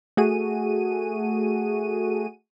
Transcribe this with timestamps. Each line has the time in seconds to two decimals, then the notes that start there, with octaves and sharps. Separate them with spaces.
0.17 A3 F#4 G#4 D#7